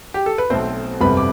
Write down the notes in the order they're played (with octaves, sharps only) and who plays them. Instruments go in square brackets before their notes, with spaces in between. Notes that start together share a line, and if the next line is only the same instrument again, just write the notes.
[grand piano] G4
A4
B4
B1 B2 A3 C4 C5
G1 F2 C3 G3 B4 B5
D6